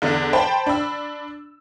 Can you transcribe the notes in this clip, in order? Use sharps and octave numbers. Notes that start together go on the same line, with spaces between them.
E2 D3 D4
C5 G5 A5 B5
D4 B5 E6